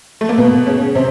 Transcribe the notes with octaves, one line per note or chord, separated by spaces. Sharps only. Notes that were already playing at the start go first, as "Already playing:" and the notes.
A3
A#3
B2 B3
C#3 C#4
C3 C4